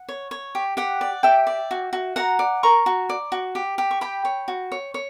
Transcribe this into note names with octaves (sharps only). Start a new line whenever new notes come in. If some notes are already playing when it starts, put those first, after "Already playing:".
Already playing: F#5
C#5
C#5
G4
G4 F#5
D5
G4 E5 G5
D5
F#4
F#4
F#4 F#5 A#5
D5
A#4 A#5 C#6
F#4
D5
F#4
G4
G4
C#6
G4 G5 B5
C#5
F#4
C#5
C#5